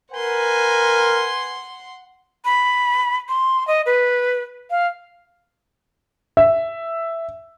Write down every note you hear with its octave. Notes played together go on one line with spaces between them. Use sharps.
A#4 B4 F#5 G#5 C6
B5
C6
D#5
B4
F5
E5